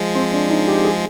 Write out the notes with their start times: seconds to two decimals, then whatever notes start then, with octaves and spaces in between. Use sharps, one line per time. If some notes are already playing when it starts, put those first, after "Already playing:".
Already playing: F3 G#3
0.15 C4
0.32 D4
0.50 D#4
0.68 G4
0.84 G#4